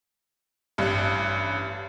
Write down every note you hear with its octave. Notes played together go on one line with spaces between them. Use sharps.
A1 G2